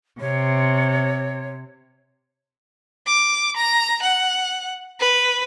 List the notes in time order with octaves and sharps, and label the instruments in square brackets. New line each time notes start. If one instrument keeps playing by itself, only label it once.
[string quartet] C3 [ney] C#5
[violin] D6
A#5
F#5
B4